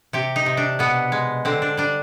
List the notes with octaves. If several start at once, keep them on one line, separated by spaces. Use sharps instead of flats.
C3 G4
D#4
C3
D4
B2 B3
G#3
D3 C4
D4
G3 D4